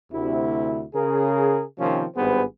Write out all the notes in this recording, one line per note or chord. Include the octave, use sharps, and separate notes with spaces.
D2 C3 E4
C#3 G#4 A#4
C3 D#3 F3 A#3 C4 C#4
G#1 G2 B3 G#4 B4 C5